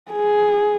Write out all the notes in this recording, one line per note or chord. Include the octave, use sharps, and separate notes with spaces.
G#4